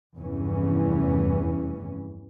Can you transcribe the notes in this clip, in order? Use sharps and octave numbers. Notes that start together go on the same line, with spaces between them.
F1 E2 G2 E3 C#4